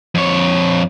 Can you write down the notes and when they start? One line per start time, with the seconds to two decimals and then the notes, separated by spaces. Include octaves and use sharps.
0.15 F2 C#5